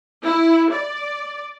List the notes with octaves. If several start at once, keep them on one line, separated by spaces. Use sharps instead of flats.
E4
D5